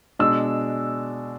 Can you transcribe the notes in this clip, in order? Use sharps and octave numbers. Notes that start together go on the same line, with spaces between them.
B2 G#3 D4 E6